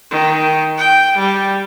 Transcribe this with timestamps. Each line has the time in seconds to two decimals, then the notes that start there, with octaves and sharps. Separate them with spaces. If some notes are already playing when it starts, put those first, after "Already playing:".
0.11 D#3
0.78 G5
1.17 G3